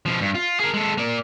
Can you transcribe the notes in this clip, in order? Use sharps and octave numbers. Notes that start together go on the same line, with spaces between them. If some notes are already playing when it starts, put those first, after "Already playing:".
B2 F3
G2
F4
G#4 A#4
G#3 A4
A#3 D5